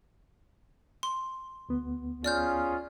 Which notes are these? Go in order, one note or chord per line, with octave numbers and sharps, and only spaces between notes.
C6
D2 B3
C#4 F4 G#4 D5 F6 G6